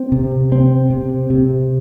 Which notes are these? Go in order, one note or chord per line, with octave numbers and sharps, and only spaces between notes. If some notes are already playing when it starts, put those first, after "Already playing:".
Already playing: C4
C3
C4
C3
C3